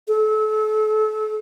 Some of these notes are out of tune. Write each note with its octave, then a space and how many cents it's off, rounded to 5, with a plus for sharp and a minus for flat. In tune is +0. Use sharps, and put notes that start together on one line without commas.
A4 -35